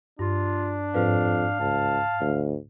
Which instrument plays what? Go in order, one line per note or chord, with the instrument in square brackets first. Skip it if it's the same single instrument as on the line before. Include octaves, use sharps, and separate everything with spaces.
[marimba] G2 [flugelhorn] D4 [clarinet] F4
[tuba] F2 [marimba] G#2 B4 [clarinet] F5
[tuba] C#2 [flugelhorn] A5
[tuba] D2